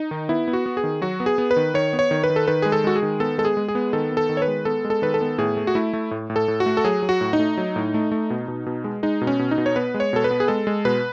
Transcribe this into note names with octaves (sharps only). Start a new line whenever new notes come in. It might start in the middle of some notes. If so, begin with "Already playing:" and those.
Already playing: D#4
D#3
B3 E4
B3
F#4
B3
G#4
D#3
F#3 F#4
B3
G#4
B3
B4
D#3
D#3 C#5
B3
C#5
D#3
B4
D#3
A4
D#3 B4
G#3 G#4
A4
G#3 F#4
G#4
D#3
B3 A4
G#3 A4
G#4
G#3
G#4
B3
D#3 A4
B3
A4
D#3
C#5
B4
G#3
B3 A4
G#3
A4
D#3 B4
A4
B3
A2 G#4
A3
F#4
A3 E4
A3
A2
A2
A4
A2
F#4
A3
A4
F#3 G#4
F#3
F#4
A2
D#4
A3
F#3
A2
A3
A3
B2
B2
B2
G#3
G#3 D#4
B2
C#4
B2
D#4
B2
C#5
B3 B4
G#3
C#5
B2 A4
B4
B3
G#4
G#3 A4
G#3
B2 B4